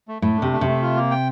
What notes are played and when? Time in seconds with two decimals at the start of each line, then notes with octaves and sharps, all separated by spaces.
0.08 A3
0.22 A2 A3
0.37 D4
0.42 C3
0.52 A3
0.61 C3
0.67 A3
0.82 F4
0.96 A#3
1.10 G5